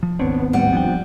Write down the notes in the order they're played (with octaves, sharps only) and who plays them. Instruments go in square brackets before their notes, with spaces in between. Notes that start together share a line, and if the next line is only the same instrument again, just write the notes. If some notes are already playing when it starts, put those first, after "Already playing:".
[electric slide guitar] F3
[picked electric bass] G#1 D#2 C4 [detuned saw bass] B3 [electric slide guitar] D4 C#5
[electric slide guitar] A2 [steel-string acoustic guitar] G3 F#5
[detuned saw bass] F3 [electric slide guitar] B3 D4 G5